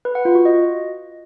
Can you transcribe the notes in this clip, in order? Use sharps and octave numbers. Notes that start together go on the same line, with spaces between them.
B4
F#5
F4
F#4
D#5